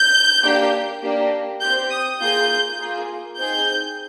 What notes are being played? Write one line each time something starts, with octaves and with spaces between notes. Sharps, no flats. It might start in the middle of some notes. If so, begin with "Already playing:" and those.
Already playing: G6
A#3 D4 G4
A#3 D4 G4
C4 G4 G6
D#6
A#3 F4 G#4 G6
A#3 F4 G#4
C4 D#4 G#4 G6